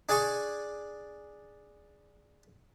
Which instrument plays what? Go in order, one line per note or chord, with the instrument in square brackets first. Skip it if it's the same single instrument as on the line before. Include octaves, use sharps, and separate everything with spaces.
[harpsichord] D4 G#4 D5 G#5 C#6